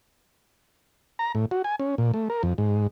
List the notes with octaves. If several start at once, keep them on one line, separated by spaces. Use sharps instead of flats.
A#5
A2
F#4
G#5
C#4
A#2
A3
A#4
F2
G#2